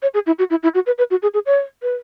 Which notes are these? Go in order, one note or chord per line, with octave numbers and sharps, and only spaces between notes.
C#5
G#4
E4
F#4
E4
E4
F#4
B4
B4
F#4
G#4
G#4
C#5
B4